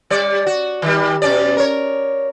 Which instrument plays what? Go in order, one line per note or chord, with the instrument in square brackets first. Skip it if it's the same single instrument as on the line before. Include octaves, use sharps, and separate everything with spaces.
[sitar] G3 D5
F#4
D#3 G3
B2 C#4 D5
A#4 C#5